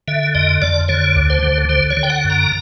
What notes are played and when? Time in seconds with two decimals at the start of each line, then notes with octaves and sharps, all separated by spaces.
0.08 D3 E5
0.35 F2 D#5
0.62 F2 D5
0.88 D3 C#5
1.15 D2
1.30 C5
1.43 D3
1.69 D3 C5
1.90 C#5
1.97 D3
2.03 G5
2.10 F#5
2.24 F#2
2.30 A#5